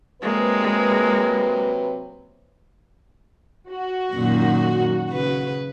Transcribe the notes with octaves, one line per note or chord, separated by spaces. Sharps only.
C3 F#3 G#3 A#3 B4
F#4
F#2 A#2 D#3
C#3 B4